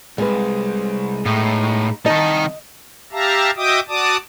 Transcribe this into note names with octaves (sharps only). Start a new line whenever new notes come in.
C2 G#3 B4
A2 B3 D#4
C2 D#3 D#4 D#5 A5
G4 E5 F5 A5 A#5
F#4 D#5 E5 G5 D6 D#6
F#4 D5 A5 D6 D#6